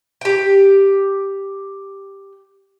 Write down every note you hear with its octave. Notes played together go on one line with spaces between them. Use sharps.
G4 G5